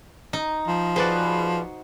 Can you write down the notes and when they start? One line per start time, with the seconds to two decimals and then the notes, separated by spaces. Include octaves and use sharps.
0.33 D#4
0.67 F3
0.96 F#4 G#4 B4 C5 D5